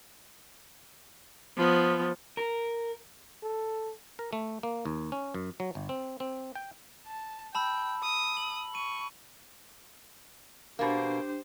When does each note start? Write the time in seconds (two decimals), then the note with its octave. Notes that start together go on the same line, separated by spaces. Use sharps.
1.57 F3 B3
2.37 A#4
3.43 A4
4.19 A#4
4.33 A3
4.63 A#3
4.85 D#2
5.12 C#4
5.34 F#2
5.60 F#3
5.75 G1
5.89 C4
6.20 C4
6.55 G5
7.07 A5
7.55 G5 A5 B5 E6
8.03 D#6
8.37 F#7
8.75 C#6 D#7
10.79 B2 A#3 D4 G4 C5